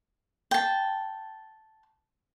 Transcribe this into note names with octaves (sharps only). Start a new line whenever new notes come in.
G5 A5